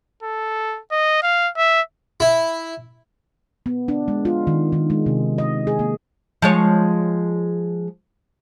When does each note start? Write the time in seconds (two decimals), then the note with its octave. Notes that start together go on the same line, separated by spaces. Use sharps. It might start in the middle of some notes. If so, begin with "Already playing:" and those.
0.23 A4
0.91 D#5
1.23 F5
1.57 E5
2.20 E4
3.66 B3
3.88 D4
4.08 G#3
4.25 F4
4.47 D#3
4.72 D#3
4.90 G#3
5.06 C3
5.38 D#5
5.67 G#4
5.79 A#3
6.42 F3 G#3 C#5